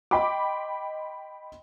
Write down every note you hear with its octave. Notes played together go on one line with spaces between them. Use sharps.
D#5 G5 B5 C6 D6